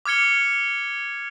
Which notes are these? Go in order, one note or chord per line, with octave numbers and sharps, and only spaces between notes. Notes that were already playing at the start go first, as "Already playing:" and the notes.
D6 F6 G#6 C#7 G7